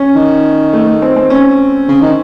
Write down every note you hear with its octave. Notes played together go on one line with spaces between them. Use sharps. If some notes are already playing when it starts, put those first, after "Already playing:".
Already playing: C#4
D#3
A3
A3
C4
C4
C#4
C#3
D#3